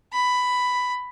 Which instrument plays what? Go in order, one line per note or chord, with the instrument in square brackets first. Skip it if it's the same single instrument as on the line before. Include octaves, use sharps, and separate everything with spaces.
[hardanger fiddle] B5